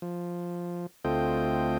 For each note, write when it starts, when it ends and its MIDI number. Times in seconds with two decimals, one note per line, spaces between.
0.02 0.86 53
1.05 1.78 38
1.05 1.78 57
1.05 1.78 60
1.05 1.78 65
1.05 1.78 75
1.05 1.78 79